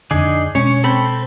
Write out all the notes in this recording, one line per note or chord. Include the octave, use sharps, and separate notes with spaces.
F2 D3 D4 D#4 G#4
B2 G#3 C#4 C#5
C4 A4 B5